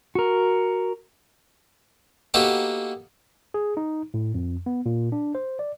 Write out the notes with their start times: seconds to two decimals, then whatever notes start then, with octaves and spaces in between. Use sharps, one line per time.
0.15 F#4 A#4
2.34 A#3 B3 D#4 F#4 G4 A4
3.54 G#4
3.77 D#4
4.14 A2
4.34 F2
4.66 B3
4.86 A#2
5.12 D4
5.35 C5
5.59 D5